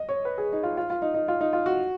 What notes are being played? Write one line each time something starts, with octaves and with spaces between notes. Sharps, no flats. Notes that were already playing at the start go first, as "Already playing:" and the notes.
Already playing: D#5
C#5
B4
G#4
D#4
F4
F4
F4
D#4
D#4
F4
D#4
F4
F#4